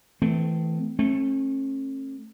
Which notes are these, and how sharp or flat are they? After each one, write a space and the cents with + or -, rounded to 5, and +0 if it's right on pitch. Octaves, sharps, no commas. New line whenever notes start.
E3 -15 A3 +0 C4 -30
A3 +0 C#4 -45